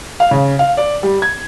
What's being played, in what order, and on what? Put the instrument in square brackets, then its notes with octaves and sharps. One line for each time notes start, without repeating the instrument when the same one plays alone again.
[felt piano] F5
C#3
F5
D5
G3
G#6